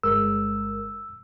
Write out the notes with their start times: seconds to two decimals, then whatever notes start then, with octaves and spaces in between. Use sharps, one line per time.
0.03 G1 G#3 A#4 E6